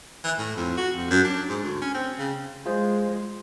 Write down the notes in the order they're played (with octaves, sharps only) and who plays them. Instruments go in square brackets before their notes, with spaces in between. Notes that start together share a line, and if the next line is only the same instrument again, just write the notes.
[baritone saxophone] E3
A2
F2
F#4
F2
F#2
D4
G#2
D2
C#4
C4
C#3
[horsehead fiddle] G#3 [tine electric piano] F4 G#4 C5